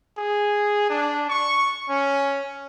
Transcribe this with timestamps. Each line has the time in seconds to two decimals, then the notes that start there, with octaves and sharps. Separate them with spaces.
0.18 G#4
0.90 D4
1.30 C#6
1.89 C#4